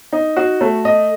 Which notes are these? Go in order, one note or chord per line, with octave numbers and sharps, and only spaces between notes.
D#4
F#4
A3
D#5